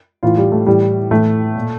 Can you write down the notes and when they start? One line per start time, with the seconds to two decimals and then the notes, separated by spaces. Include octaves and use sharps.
0.23 A2 E3 F4
0.37 G3
0.52 A3
0.66 A2 E3 G3
1.11 A2 E3 A3
1.55 A#2